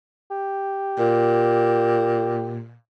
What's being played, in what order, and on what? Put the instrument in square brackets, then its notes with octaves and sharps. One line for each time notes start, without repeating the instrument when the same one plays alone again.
[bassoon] G4
[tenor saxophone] A#2